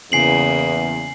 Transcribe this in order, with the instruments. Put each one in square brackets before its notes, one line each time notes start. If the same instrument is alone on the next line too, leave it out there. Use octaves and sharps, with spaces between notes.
[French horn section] E2 [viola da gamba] C#3 A#3 [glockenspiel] G#5 C7 F#7